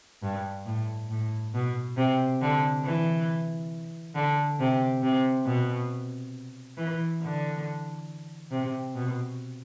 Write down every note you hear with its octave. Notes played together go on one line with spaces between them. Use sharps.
G2
A2
A2
B2
C3
D3
E3
D3
C3
C3
B2
E3
D3
C3
B2